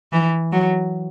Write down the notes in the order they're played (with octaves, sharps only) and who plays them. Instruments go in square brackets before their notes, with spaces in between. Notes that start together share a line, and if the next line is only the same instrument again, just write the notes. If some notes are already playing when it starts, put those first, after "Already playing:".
[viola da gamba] E3
F#3